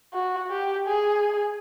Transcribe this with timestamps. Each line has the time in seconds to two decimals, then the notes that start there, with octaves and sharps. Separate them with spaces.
0.14 F#4
0.51 G4
0.87 G#4